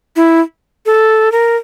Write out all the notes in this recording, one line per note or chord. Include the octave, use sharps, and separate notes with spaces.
E4
A4
A#4